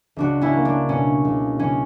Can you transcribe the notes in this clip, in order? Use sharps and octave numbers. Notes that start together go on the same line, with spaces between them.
C#2 D4 F#4
C#4 E4
A#3
D4
B2 C#4
C#2
C#2 C#4